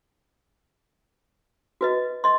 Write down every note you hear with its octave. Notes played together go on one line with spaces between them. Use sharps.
F#4 B4 D#5
D#5 C6